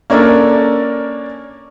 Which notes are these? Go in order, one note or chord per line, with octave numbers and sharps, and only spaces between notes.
A#3 C#4 D4 A4 A#4